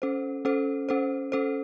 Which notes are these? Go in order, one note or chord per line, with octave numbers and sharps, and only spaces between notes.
C#4 A4 C5
C#4 A4 C5
C#4 A4 C5
C#4 A4 C5